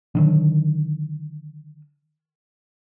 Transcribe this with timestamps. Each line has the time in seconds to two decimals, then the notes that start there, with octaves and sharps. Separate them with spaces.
0.15 D3 D#3 F#3